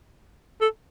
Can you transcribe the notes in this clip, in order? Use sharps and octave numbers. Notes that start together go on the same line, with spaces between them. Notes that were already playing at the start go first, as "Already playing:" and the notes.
A4